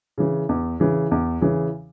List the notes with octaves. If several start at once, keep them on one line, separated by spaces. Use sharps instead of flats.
C#3 E3
E2
C#3 E3
E2
C#3 E3